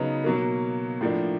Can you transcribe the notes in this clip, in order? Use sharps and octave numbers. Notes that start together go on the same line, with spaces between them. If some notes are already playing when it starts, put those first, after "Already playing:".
Already playing: C#3 F#3 B3 D#4
B2 F#3 A#3
A2 F3 A#3 D4